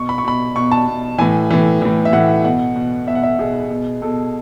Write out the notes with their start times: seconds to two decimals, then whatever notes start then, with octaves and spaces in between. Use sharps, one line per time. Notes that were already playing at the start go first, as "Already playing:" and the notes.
Already playing: B2 C#6
0.09 B5
0.18 C#6
0.24 B2 B5
0.55 B2 C#6
0.72 A5
0.87 B2
1.18 A2 E3 G#5
1.50 A2 E3
1.82 A2 E3
2.05 E5
2.13 A2 E3 F#5
2.44 B2 F#5
2.76 B2
3.07 B2 E5
3.15 F#5
3.23 E5
3.39 B2 G#4
3.70 B2
4.02 B2 A4